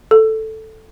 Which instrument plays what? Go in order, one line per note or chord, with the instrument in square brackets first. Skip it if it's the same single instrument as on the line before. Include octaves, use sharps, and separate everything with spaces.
[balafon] A4